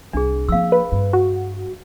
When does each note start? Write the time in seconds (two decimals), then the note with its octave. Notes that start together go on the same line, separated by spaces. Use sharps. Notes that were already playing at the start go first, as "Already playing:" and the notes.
0.13 C2 D4 G#4
0.49 F3 A#3 F5 E6
0.72 B4
0.92 G2
1.13 F#4